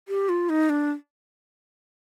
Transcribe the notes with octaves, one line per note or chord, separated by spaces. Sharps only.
G4
F4
D#4
D4